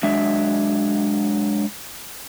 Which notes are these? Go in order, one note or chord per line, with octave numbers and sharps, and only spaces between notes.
F#3 G#3 D4 E5